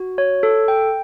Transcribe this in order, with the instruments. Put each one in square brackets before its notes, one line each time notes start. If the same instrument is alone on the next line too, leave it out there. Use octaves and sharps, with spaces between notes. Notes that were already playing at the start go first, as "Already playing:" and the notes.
Already playing: [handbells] F#4
C#5
A4
G5